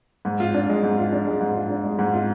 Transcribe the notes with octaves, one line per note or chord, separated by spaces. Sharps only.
G#2
F4
D4
G#3
G#2
F4
D4
G#3
G#2
F4
D4
G#3
G#2
F4